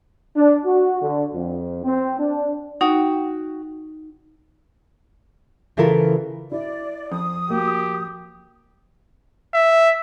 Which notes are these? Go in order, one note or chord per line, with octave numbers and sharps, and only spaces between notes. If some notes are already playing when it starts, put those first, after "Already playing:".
D4
F#4
D3
F2
C4
D4
D#4 F#4 G5
C#3 E3 E4 F4 A4 A#4
E4 D5
F2 D#6
A#3 F#4 G4
E5